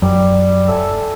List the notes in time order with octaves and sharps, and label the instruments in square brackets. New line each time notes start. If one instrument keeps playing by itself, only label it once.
[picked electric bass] F#2 F#3 [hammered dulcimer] G3
[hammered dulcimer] A4 E5 G#5